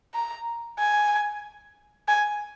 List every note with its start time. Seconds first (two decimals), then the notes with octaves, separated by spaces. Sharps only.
0.14 A#5
0.79 G#5
2.08 G#5